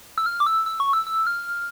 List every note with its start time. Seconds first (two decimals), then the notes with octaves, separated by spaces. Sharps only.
0.18 E6
0.26 F6
0.40 D6
0.47 E6
0.66 E6
0.80 C#6
0.93 E6
1.07 E6
1.27 F6